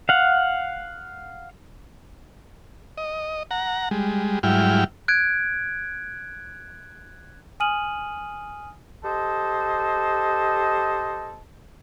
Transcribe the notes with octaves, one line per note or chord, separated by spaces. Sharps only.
F5 F#5
D#5
F#5 A#5
G3 G#3
G#2 F#3 G3 E4 G5 F6
F#6 G#6 D7
G#5 D#6 F6 D#7 F#7
G4 A4 C5 D#5